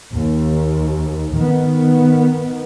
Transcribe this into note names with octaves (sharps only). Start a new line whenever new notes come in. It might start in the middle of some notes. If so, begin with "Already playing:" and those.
D#2
D#3 B3